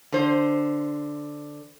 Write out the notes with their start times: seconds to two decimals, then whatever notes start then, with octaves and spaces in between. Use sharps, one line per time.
0.12 D3 C5